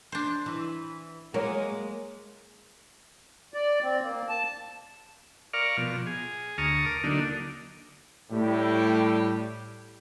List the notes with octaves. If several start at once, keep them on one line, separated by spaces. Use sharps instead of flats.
D4 C5
E3
F#3 G#3 A#3 A#4 C#5
D5
C4
A#3
A5
A#4 D5 F5 C#6 F6
B2 F3
G#4
D2 A5 A#5 C#6 D#6 F6
A#4 D6
D3 F#3 A#3 D4 D#4 A4
A2 G3 G4